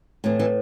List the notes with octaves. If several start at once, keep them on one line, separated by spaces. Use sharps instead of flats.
A2 E3
E3